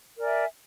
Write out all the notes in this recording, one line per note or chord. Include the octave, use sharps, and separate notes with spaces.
A#4 D5 E5 G#5